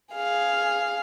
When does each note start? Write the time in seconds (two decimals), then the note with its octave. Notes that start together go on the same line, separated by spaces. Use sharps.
0.14 G#4 F5